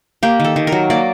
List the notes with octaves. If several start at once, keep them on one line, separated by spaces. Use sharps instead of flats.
A#3 G4
D#3 A4
D#3
A#4
F#3
A#3 D5